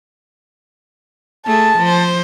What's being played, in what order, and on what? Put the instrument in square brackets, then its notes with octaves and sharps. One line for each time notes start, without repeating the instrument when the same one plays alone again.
[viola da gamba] A3 G#4 [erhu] A5
[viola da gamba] F3 C5